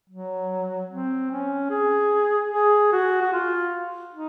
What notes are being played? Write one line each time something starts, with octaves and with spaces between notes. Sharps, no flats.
F#3
C4
C#4
G#4
G#4
F#4
F#4
F4
D#4